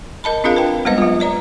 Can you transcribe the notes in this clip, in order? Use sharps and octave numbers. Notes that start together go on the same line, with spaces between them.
A#4 D#5 A5 B5
C4 D4 F4 G#4 A#4 F5
B4 G5
G3 G#3 B3 B4 C5 D#5
F#3 F4
B4 D5 A#5